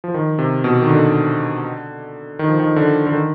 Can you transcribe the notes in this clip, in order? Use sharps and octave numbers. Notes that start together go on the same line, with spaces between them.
F3
D#3
C3
B2
D#3
D3
D#3
F3
D#3
D3
D3
D#3